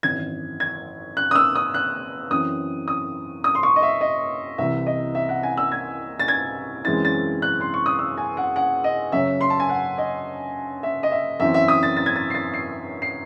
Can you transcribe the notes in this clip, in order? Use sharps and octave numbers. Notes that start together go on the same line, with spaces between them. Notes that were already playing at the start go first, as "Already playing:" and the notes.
G#1 F#2 E3 G#6
G#6
F#6
D#6
E6
D#6
F#6
F#2 E3 C4 D#6
D#6
D#6
C6
C#6
D#5
E5
D#5
C2 C3 E3 C4 E5
D#5
E5
F#5
G#5
E6
G#6
A6
G#6
F#2 E3 G#3 C4 A6
A6
F#6
C6
C#6
D#6
E6
G#5
F#5
F#5
D#5
F#2 C#3 F#3 C#4 E5
C6
A5
G#5
F#5
D#5
E5
D#5
E5
F#2 E3 C4 E5
E5
D#6
A6
A6
G#6
A6
C7
A6
C7
C7